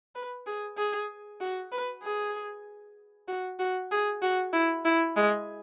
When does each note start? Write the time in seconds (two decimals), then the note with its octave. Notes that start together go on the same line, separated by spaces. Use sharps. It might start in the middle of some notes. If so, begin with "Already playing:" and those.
0.15 B4
0.46 G#4
0.78 G#4
1.41 F#4
1.72 B4
2.03 G#4
3.28 F#4
3.59 F#4
3.91 G#4
4.22 F#4
4.53 E4
4.85 E4
5.16 G#3